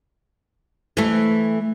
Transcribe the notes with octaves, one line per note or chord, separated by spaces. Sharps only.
E3 A3